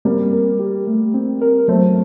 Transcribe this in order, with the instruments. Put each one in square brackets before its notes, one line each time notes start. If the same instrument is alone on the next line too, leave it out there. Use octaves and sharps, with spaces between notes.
[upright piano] G3 A#3 [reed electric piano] C4
[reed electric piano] A#4
G4
A3
C4
A#4
[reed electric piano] F#3 [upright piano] A3 C4